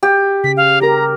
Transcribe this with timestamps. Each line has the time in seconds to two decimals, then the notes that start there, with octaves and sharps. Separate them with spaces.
0.03 G4
0.44 C#3 B6
0.57 F5
0.82 G4 A#4 A#5